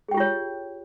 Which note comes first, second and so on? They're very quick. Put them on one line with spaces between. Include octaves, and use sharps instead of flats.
G#4 G5 G4 F4 C#5